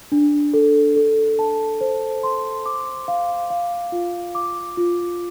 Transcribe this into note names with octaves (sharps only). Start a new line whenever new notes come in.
D4
A4
A4
A5
C5
C6
D6
F5
F5
F4
D6
F4